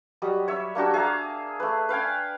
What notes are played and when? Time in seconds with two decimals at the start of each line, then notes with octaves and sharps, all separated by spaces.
0.22 F#3 G3 D#5
0.48 C#5 E5
0.75 A#3 D4 F#4 G4
0.94 G#4 E5 F5 A#5
1.60 A3 B4
1.89 B4 F5 G5 G#5